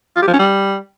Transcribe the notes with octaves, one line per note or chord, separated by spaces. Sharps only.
F4
G4
F3
C#4
G3